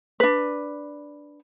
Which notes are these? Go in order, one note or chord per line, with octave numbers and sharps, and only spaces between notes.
D4 B4